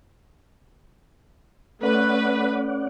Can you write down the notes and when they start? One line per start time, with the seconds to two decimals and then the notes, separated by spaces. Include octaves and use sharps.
1.83 A3 C#4 B4 D5 F#5